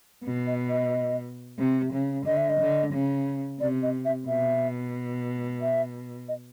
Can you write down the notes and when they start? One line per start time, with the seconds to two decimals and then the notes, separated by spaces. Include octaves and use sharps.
0.24 B2
0.47 D#5
0.69 D#5
1.58 C3
1.93 C#3
2.26 D3 D#5
2.37 E5
2.49 D#5
2.60 D3
2.93 C#3
3.60 C3 D5
3.83 D#5
4.05 E5
4.28 B2 E5
5.62 E5
6.29 D#5